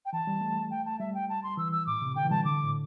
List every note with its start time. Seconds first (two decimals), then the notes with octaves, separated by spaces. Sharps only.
0.05 G5
0.13 E3 A5
0.27 G3
0.41 A3
0.71 G5
0.85 A5
0.99 G3 E5
1.14 G5
1.29 A5
1.43 C6
1.57 E3 E6
1.72 E6
1.87 A2 D6
2.02 C3
2.16 D3 G5
2.25 E3
2.31 G3 A5
2.45 D3 D6
2.63 A2